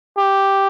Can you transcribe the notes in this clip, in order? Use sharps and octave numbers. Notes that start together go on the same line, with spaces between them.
G4